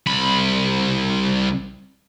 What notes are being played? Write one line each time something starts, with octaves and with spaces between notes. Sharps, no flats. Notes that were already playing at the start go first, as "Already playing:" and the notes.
C2 B5